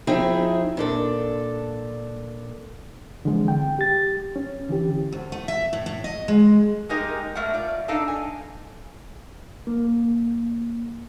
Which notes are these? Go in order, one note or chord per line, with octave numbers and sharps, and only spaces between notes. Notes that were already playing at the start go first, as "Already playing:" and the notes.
F3 C4 D#4 E4 G#4 E5
A#2 D4 A4
D3 E3 F3 G#3 C4
G5
G4 A6
C#4
D3 E3 G4
D2
A3
E5
A2
A2
D#5
G#3
G#3 A#3 D#4 G4 A#4 D#5
B2 A3 A#4 D5 F#5
F4 D5
B3 D4 D#4 A4 D#5 F5
G#5
A#3